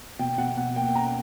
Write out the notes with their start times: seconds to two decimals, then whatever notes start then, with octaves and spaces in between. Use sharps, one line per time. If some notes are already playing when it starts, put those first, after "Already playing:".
0.19 B2 G5
0.38 B2 F#5
0.57 B2 F#5
0.76 A#3 G5
0.95 C#4 A#5